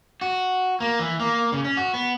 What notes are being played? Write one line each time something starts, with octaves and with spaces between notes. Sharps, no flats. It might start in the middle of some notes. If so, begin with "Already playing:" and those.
F#4
A#3
E3
A#3
C#3
C#4
F#4
B3